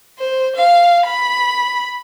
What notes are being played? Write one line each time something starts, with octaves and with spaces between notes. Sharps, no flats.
C5
F5
B5